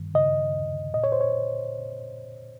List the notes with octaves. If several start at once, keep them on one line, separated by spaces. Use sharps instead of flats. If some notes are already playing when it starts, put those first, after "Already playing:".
Already playing: G2 D#3
C#3 D#5
D#2
A#2 D#5
C#5
C5
C#5